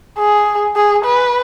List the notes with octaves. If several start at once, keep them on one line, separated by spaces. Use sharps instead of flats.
G#4
G#4
B4